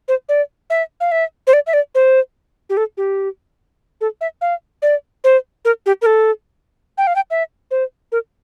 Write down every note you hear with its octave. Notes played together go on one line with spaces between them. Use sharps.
C5
D5
E5
F5
E5
C5
D5
E5
D5
C5
G4
A4
G4
A4
E5
F5
D5
C5
A#4
G4
A#4
A4
G5
F5
G5
E5
C5
A#4